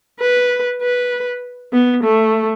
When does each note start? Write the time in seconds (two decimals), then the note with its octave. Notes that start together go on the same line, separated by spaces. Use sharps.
0.20 B4
0.82 B4
1.72 B3
2.03 A3